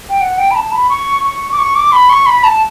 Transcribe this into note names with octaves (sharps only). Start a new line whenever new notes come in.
G5
F#5
G5
B5
A5
B5
C#6
C#6
D6
C#6
D6
B5
C#6
B5
A5